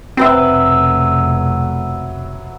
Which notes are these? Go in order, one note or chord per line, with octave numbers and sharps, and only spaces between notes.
F1 B2 F#3 C4 B4 E5